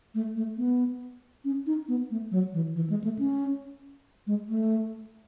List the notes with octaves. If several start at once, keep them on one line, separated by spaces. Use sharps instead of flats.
A3
A3
B3
C#4
D#4
B3
A3
F#3
E3
E3
G#3
A3
C#4
G#3
A3